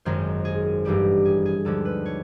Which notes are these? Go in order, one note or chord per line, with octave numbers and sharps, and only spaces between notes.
G#1 F#2 D#3 G#3 C5
G#4
A1 G2 E3 G3 G4
G#4
G#4
D#2 D3 F3 G#3 A4
B4
C#5